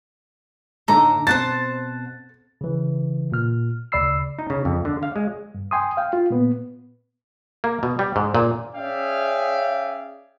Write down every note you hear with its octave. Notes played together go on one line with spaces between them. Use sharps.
A2 D3 D#4 A4 A#5 D6
B2 C4 C5 F#5 A5 A6
C#3 E3
A#2 F6
D2 C#3 D5 B5 E6 C7
D#4
C#3
F2
D3
F5
G#3
G2
G5 G#5 C6 D#6
F5 G5
F4
A#2 B3
A#3
B2
G3
G#2
A#2
C#4 G#4 D5 E5 F5 G5